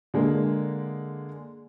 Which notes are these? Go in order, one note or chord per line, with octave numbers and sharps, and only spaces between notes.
D3 G#3 A#3